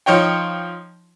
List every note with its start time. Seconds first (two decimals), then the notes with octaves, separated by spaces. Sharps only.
0.06 F3 D#4 C#5 G5